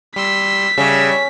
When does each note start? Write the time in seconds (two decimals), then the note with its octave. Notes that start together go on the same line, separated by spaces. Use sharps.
0.16 G3 C6 E6 B6
0.78 C#3 G3 E5